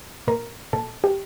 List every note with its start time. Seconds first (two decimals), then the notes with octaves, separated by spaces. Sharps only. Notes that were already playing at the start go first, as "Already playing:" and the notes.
0.28 A#2 A#4
0.73 A#2 A4
1.04 G4